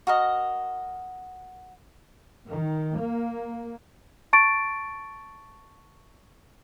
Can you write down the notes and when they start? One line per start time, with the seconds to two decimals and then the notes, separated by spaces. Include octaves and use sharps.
0.07 F#4 A#4 D#5
2.49 D#3
2.98 A#3
4.33 A5 C#6 A6 D7